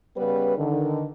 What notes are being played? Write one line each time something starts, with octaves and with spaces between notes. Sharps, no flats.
C#3 G3 B3 B4
D3 D#3